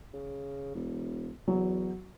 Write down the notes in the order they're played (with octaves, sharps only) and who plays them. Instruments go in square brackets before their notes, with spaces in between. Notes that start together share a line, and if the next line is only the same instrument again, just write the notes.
[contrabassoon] C#3
E1
[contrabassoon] E2 [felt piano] F#3